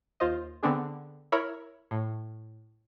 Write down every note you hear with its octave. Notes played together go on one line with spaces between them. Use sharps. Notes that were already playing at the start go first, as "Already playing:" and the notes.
D#2 F4 C5 D#5
D3 B3 C4 D4 G#4
E4 A#4 C#5 E5 B5
A2